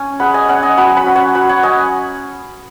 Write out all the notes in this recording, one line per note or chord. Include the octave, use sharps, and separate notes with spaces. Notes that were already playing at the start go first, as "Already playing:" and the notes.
Already playing: C#4 G#5
G#3 F#5 B5
D#5 G#5
C#4 C#5 F#5
D#5 G#5
F#3 F#5 B5
F#5 B5
C#4
C#5 F#5
F#3 F#5 B5
C#5 F#5
C#4 D#5 G#5